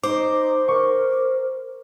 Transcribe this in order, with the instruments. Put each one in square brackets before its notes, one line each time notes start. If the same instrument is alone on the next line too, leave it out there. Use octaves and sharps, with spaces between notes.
[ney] D#4 [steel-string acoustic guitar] C5 [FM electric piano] D6
[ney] A#4 [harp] C#6